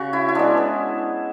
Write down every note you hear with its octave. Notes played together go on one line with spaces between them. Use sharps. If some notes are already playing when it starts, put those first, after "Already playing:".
Already playing: C#3 F#4
E4
E4
G#3 B3 D4
G#4